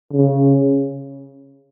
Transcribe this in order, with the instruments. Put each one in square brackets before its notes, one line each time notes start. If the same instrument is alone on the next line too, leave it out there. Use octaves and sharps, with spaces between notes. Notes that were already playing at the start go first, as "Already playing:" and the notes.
[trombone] C#3